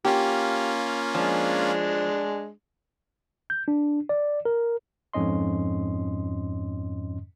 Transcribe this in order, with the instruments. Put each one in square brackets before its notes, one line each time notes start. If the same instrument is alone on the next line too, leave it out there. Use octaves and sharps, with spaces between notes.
[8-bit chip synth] A#3 C#4 F4 [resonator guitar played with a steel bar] G4
[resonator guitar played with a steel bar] F3 [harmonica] G#3 D4
[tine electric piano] G6
D4
D5
A#4
F2 G#2 C#4 D#5 C6